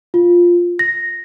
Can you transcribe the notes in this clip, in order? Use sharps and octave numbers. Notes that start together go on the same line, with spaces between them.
F4
A#6